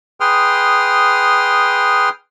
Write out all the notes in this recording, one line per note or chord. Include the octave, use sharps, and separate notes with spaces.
G#4 B4 G5 C6 D#6 F6